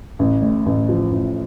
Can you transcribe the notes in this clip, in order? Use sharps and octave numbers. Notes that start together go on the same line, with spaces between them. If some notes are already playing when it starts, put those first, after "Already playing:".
A1
A2
A1
F3
A1